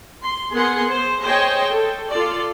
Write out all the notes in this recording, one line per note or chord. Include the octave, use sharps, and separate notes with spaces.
C6
B3 G#4 A#4 F#5 G#5 C6
C5
G#4 C5 C#5 D#5 G5
A4
F4 A4 D5